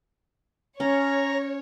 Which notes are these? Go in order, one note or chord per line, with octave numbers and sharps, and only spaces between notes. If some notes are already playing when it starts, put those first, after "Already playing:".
C#4 C#5 A#5